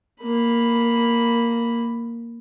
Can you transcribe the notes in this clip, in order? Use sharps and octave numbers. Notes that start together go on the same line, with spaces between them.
A#3 B5